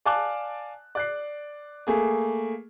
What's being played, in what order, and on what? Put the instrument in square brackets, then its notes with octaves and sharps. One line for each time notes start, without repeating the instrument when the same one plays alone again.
[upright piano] D5 F5 G#5 A5 D6 F#6
D5 F#6 C7
A3 A#3 G#4